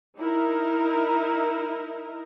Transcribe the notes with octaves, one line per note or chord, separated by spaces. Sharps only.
D#4 E4 A#4